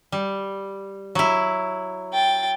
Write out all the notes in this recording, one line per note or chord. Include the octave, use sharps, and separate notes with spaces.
G3
F#3 E4
G5 A6